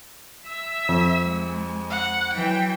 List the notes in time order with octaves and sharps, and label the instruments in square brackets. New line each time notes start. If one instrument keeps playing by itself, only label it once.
[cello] E5 [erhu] E6
[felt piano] F2
[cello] G#3
[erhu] F#5
[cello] E3 F#3 [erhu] G5